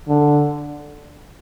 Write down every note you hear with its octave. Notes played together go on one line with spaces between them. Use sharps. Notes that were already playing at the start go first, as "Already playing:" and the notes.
D3